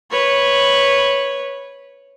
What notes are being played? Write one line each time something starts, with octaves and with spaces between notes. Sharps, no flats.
B4 C#5